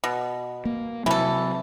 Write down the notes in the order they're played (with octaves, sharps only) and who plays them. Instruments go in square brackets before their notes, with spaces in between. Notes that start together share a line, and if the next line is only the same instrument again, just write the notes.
[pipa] B2
[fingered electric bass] A#3
[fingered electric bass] C3 F#3 [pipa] E3 A4